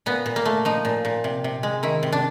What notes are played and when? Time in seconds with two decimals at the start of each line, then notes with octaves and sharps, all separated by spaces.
0.06 A#2 B3
0.26 A#2
0.36 A#3
0.45 A3
0.65 F3 D#4
0.85 A#2
1.05 A#2
1.24 C3
1.44 C3
1.63 G#3
1.83 D#3 E4
2.03 C3
2.12 D4